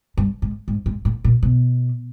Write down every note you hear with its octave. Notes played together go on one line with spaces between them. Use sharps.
G2
G#2
G#2
G#2
A2
A#2
B2